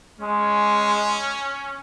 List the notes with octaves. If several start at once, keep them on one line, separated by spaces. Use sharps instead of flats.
G#3 C#4